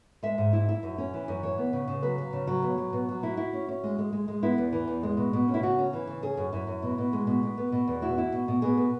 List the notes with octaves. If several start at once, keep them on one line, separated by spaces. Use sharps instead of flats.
G#3 E5
G#2
E4
E4
F#2
C#4
E3
F#2
E3 C#5
B3
C#3
C#3
F#3 B4
F#3
C#3
F#3
B2
F#3
B2
F#3
E4 F#4
E4
C#4
C#4
G#3
G#3
G#3
G#3
B3 E4
E2
E3
E2
G#3
B2
B2
C#4
E4
C#3 F#4
C#4
E3
C#3
C#4 G#4
F#2
F#2 E4
F#2
B2
B2
G#3
B2
B2
B3
B2
E2
E4 F#4
E4
B2
B2
B2 G#4
B3